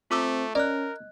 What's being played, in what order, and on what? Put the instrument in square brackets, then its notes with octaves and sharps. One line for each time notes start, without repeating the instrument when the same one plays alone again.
[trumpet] A3 [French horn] C4 [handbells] F4 D6 E6
[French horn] C#4 [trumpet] A#4 [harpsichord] D5 [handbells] D#5 F#6